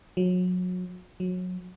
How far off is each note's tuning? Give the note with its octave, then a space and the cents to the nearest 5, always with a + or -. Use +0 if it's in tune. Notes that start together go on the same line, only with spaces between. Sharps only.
F#3 -30
F#3 -25